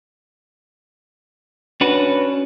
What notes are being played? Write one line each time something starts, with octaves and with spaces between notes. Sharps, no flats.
C#4 D4 F#4 B4